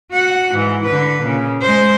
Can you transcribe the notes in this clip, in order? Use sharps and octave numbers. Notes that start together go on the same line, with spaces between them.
F#4 F#5
G#2 E3
D3 B4
A#2 C#3
G#3 C5